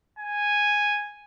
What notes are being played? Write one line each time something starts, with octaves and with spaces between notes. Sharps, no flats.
G#5